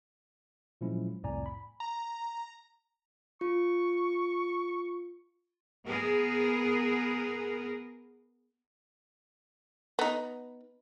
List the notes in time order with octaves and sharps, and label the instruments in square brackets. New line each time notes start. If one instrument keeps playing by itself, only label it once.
[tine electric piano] A#2 F3 F#3 G#3 C#4 E4
C2 F2 A2 D5 G#5 A#5
B5
[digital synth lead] A#5
[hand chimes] F4 [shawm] C#6
[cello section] B3 G#4 A#4
[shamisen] B3 D#4